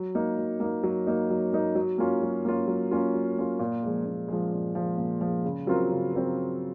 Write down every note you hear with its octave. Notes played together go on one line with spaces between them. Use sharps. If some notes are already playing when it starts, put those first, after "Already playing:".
Already playing: F#3
A#3 D#4
F#3
A#3 D#4
F#3
A#3 D#4
F#3
A#3 D#4
F#3
A#3 C#4 F4
F#3
A#3 C#4 F4
F#3
A#3 C#4 F4
F#3
A#3 C#4 F4
A#2
F3 G#3
A#2
F3 G#3
A#2
F3 G#3
A#2
F3 G#3
C#3
F#3 C4 F4 A#4
C#3
F#3 C4 F4 A#4